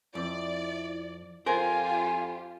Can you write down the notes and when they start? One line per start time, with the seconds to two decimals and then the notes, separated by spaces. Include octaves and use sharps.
0.15 F2 E4 D5
1.46 F2 F4 G4 A#4 C5 G#5